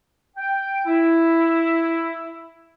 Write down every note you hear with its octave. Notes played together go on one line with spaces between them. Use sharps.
G5
E4